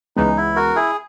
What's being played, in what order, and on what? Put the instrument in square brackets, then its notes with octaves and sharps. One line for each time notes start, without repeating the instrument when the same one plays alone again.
[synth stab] C#2 C#3 E3 G#3 B3 [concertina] D#4
[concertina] E4
F#4 A#4
E4 G#4